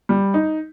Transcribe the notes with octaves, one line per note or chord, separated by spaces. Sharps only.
G3
D#4